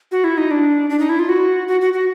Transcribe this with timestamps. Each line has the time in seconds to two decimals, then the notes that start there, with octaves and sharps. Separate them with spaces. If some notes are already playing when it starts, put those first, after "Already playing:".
0.12 F#4
0.24 E4
0.38 D#4
0.51 D4
0.90 D4
1.00 D#4
1.09 E4
1.19 F4
1.29 F#4
1.68 F#4
1.81 F#4
1.93 F#4